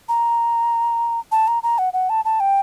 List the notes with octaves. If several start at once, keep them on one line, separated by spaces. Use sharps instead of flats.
A#5
A5
A#5
A#5
F#5
F#5
A5
A5
G5